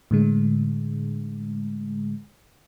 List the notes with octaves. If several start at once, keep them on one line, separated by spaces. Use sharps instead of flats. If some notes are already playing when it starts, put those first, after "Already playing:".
A2 D3 G#3